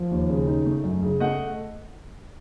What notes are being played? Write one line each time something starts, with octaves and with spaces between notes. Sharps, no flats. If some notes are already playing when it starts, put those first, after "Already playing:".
Already playing: F3
D#2
C#3
D#4
A3
F#2
C#3
A3 D#5 F#5